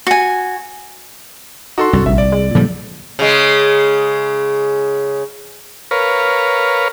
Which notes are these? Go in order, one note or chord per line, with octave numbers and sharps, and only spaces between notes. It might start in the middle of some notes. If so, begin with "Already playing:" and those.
F#4 G#5
D#4 F#4 A4 C6
C2 G2
A#1 E5
D5
G#3
A#2 D3 F3 G3
C#3 G#3
A#4 B4 C#5 F5